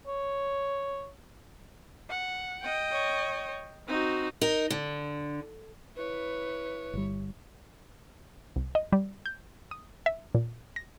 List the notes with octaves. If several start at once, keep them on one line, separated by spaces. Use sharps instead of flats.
C#5
F#5
D#5 G5
C#5
C4 D#4 F#4
D#4 A#4
D3
E4 B4 C#5
G1 G3
C2
D#5
G3
G6
D#6
E5
A#2
A#6